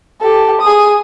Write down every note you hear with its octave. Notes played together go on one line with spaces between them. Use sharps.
G4 A4
G#4 D#6